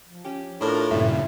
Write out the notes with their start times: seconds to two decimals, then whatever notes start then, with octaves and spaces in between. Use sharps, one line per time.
0.06 F3
0.25 C#4 G4
0.61 A2 D4 F4 A#4
0.91 G2 A#2 C#3 E4 E5